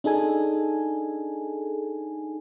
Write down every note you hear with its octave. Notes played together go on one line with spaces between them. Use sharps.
D4 D#4 G#4 A4 G#5